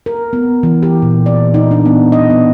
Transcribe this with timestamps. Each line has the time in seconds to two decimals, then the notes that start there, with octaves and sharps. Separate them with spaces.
0.06 A#4
0.33 B3
0.63 E3
0.83 G4
1.02 A#2
1.26 D5
1.54 D#4
1.71 D4
1.86 B3
2.12 D#5
2.30 B3